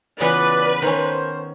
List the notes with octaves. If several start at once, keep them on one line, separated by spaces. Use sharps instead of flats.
C#3 E3 B3 F4 B4 D5
D#3 C#4 A#4 C5